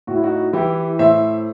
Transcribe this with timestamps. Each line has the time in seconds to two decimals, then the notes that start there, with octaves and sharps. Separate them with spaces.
0.07 A2 F#4
0.15 E4
0.23 D#4 F#4
0.53 E3 E4 G4
0.99 A2 C5 E5